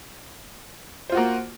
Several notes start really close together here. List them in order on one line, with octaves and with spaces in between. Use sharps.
C5 F4 F#4 A#3